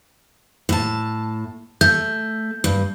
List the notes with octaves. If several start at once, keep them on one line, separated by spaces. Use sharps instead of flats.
A2 A5
A3 G6
G2